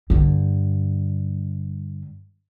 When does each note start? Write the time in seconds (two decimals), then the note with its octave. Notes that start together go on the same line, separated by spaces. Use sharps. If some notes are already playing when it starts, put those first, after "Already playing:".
0.10 G2 D3